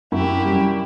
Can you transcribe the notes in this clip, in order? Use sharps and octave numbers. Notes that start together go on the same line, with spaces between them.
F#2 E4 G4
G3